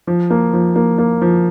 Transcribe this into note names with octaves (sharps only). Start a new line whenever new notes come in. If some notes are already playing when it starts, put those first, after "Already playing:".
F3
A#3
F3
A#3
A#3
F3